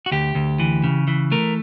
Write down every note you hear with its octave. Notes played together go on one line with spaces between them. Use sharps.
F#4
D2 G4
D2
E3
C#3
E3
A3 A#4